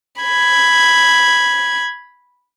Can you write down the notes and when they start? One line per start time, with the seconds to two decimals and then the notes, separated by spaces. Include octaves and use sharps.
0.22 B5 G#6